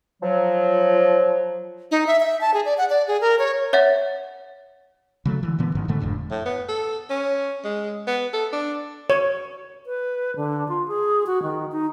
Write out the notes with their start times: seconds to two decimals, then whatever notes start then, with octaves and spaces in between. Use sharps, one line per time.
0.23 F3 F#3
1.91 D#4
2.07 E5
2.20 E5
2.41 A5
2.54 G#4
2.65 D5
2.78 F#5
2.90 D5
3.08 G#4
3.21 A#4
3.39 C#5
3.73 C#5 E5 F#5 A6
5.25 C#3 F#3 A3
5.43 D3 E3
5.59 A#2 D3 E3 B3
5.75 A1 G#2 D#3
5.88 G#2 B2 D3 A3
6.01 F1 F2 A2 D3
6.31 A2
6.45 B3
6.69 A4
7.10 C#4
7.64 G#3
8.07 B3
8.33 A4
8.52 D4
9.10 C#5
9.86 B4
10.36 D3
10.68 F4
10.88 G#4
11.27 F#4
11.43 D#3
11.72 D#4